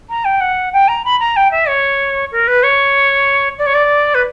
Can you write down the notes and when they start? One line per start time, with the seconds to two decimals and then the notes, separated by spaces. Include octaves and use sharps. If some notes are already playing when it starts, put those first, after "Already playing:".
0.09 A#5
0.24 G5
0.40 F#5
0.73 G5
0.88 A#5
1.05 B5
1.19 A#5
1.36 G5
1.51 E5
1.68 C#5
2.32 A#4
2.47 B4
2.63 C#5
3.58 D5
3.66 C#5
3.74 D5
4.14 B4